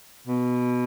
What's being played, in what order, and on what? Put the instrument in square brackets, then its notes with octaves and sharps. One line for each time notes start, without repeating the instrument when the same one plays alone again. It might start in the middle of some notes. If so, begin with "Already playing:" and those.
[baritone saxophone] B2